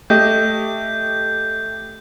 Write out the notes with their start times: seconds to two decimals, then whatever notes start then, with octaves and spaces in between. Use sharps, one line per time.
0.10 A3 G4 D#5 G6